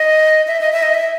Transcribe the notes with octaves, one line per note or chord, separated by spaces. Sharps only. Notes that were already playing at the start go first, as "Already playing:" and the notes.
Already playing: D#5
E5
D#5
E5
D#5
E5